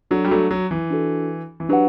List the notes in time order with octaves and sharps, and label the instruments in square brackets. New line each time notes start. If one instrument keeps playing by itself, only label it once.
[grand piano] F#3 [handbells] D4 F#4 A4
[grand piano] G3
F#3 A3
F#3
E3
[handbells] D4 F#4 A4
[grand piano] E3
[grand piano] F#3 [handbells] D4 G4 B4 F#5